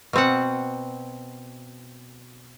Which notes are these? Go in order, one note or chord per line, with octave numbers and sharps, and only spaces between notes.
B2 C4 F#5